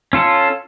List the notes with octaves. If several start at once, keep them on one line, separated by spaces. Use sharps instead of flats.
C#4 F4 A4